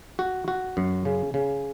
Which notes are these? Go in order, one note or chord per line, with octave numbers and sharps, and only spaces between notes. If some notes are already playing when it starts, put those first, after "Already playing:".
F#4
F#4
F#2
C#3
C#3